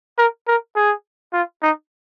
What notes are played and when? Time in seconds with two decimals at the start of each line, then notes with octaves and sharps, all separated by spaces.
0.18 A#4
0.47 A#4
0.76 G#4
1.33 F4
1.62 D#4